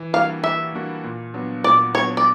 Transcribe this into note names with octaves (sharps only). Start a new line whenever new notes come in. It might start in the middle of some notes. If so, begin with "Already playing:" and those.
Already playing: E3
G3 A#3 D4 F#4 F5
E3 E5
G3 A#3 D4 F#4
A#2
F#3 B3 D4
A#2 D5
F#3 B3 D4 C#5
D5